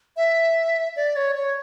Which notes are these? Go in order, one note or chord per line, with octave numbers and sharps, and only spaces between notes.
E5
D5
C#5
C#5